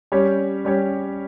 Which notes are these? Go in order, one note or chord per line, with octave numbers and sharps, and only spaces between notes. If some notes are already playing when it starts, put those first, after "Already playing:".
G3 C#4 G4 C#5
G3 C#4 G4 C#5